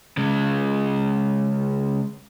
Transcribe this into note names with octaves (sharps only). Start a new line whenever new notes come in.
C#3 G#3